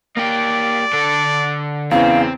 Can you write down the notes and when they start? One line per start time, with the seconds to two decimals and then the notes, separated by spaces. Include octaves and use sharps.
0.17 A#3 G4 D5
0.93 D3 A4
1.91 E2 C#3 E3 C4 F5